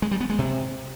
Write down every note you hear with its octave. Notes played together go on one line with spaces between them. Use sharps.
G#3
G3
B3
G#3
C3